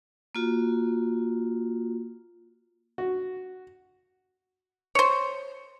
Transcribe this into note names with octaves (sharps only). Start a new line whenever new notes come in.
A#3 F4 F#4
F#4
C5 C#5